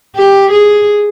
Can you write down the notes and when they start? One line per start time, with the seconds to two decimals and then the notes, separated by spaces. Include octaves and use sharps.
0.16 G4
0.51 G#4